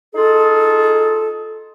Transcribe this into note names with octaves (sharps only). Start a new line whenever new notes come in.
D#4 F4 G#4 A4